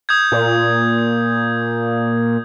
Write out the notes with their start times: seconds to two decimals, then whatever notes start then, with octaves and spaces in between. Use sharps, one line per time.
0.09 D#6 G6 G#6
0.32 A#2